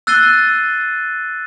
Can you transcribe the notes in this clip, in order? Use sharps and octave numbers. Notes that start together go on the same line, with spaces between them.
E6 F#6 A6 C7 D#7 G7